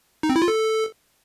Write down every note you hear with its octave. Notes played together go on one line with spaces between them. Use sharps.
D#4
C4
E4
F4
A4